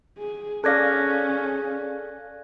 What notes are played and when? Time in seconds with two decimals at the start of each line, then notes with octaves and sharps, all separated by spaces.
0.18 G#4
0.64 C#4 G#4 A4 D5 F5 F#6 G#6 A#6